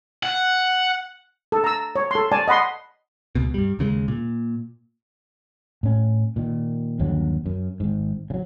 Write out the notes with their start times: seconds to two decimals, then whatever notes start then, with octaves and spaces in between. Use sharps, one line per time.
0.23 F#5
1.52 A4
1.64 A#5 E6
1.96 C#5
2.11 A4 C6
2.32 D5 G#5 A5
2.48 D#5 F#5 B5 C6
3.35 C#2 B2
3.54 G2 G3
3.79 D#2 C#3 G3 G#3
4.08 A#2
5.83 A2 C#4
6.36 A#2 D#3
6.99 G1 D#2 D3 F#3
7.46 F#2
7.80 G#1 G#2
8.30 C#3 F#3